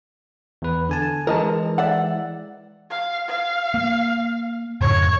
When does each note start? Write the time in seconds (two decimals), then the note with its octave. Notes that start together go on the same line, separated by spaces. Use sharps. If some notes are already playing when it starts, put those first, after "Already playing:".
0.62 E2 B4
0.89 D3 G#5 A5
1.27 E3 G#3 A#4 D#5 A5
1.78 D5 E5 F#5
2.90 F5
3.29 F5
3.74 A#3
4.81 F2 G#2 C#3 C#5